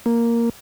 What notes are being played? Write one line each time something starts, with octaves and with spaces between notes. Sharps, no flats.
A#3